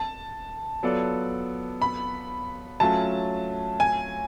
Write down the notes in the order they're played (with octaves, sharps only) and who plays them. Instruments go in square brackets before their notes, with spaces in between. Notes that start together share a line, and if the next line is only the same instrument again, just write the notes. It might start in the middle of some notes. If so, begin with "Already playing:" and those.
Already playing: [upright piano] A5
[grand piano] F#3 B3 F4 A4 D5
[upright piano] B5
[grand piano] F#3 A3 C#4 F4 [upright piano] A5
[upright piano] G#5